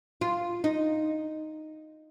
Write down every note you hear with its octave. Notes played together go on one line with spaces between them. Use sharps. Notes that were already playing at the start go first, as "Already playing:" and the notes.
F4
D#4